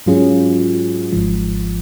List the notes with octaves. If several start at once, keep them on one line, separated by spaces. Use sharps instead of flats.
G#2 F#3 C#4 F4 G#4
G#1 G#2 F3